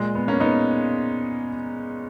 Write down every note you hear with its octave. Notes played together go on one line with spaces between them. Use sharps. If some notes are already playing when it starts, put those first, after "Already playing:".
Already playing: A#2 G#3
B3
A#3 C#4
B3 D#4